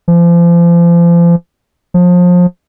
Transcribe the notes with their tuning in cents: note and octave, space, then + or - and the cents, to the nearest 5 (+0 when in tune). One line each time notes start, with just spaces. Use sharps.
F3 -35
F3 +30